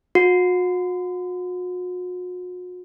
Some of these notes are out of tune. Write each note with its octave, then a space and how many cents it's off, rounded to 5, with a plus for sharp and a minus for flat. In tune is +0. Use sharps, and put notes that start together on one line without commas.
F#4 -40